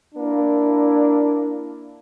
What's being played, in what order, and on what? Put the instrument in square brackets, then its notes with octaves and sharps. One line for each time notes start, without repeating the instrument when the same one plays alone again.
[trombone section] A#3 D4 E4